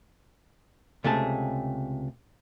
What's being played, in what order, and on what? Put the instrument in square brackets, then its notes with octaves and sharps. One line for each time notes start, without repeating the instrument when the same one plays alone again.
[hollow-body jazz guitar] C#2 C3 A3 G#4 A5